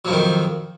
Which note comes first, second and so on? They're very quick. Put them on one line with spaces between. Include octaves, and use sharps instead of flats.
F#3 F3 F2 D#3